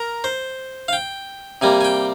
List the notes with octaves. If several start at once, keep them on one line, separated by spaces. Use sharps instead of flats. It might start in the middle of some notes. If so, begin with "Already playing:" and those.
Already playing: A#4
C5
F5
G5
C3 G3 A#3 G#5
G#5
G5